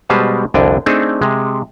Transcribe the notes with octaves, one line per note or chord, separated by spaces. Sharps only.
B2 G3 G#3 B4 C5 A5
C2 F2 D3 D4 G5 G#5
A3 C4 D4 D#4 G#4 A4
C3 G#3